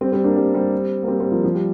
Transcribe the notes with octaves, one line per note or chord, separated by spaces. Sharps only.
G3 C4
G3 C4
A#3 D4
G3 C4
G3 C4
A#3
G3 C4
G3 C4
F3 A#3
F3
G3